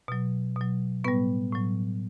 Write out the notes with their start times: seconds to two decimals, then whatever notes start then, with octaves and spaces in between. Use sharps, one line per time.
0.08 B2 F#3
0.56 B2 F#3
1.04 A2 G3 B3 B4
1.53 A2 F#3